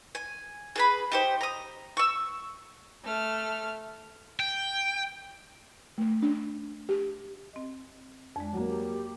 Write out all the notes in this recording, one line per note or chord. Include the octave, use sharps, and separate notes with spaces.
G#5
G#4 B4 B5
D#4 G4 C5
A#5 D#6
C#6 E6
A3 F6
G5
A3
D4
G4
C4 D#5
F2 G#3 D4
F#3 A#3
G4